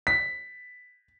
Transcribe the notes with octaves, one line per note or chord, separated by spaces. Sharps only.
B6